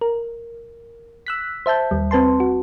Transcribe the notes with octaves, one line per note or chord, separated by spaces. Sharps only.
A#4
E6 F#6 B6
C5 E5 A5 G6
D#2 G3
C4 B4 A5 C6
F#4